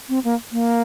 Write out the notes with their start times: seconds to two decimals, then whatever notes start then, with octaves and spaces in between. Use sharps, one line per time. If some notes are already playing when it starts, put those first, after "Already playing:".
0.09 C4
0.24 A#3
0.52 A#3